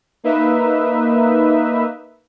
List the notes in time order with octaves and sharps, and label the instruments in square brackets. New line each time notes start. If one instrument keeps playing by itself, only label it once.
[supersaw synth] A#3 D#4 B4 E5